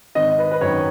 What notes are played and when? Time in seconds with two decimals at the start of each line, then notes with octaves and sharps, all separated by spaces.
0.15 G#1 D#5
0.38 B4
0.51 B4
0.61 F#2 D#3 C#5